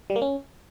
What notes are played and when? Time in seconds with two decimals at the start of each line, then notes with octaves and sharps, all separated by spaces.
0.10 G3
0.16 A#3
0.22 C#4